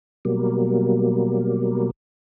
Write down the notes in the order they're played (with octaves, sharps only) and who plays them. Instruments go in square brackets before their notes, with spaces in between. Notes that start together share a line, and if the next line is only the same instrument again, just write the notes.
[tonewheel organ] B2 F#3 G3 A#3